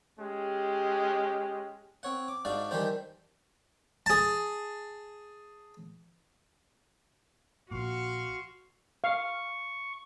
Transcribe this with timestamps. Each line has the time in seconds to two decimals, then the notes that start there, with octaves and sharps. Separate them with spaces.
0.18 G#3 C#4 G4
2.03 C4 C#5 F#5
2.28 D6
2.45 G#2 D4 F#4 D5 F5
2.71 D#3 E3 G3 D4 G4 C5
4.06 G#4 A5
7.71 A#1 A#2 F#4 F5 C6 C#6
9.04 F5 C#6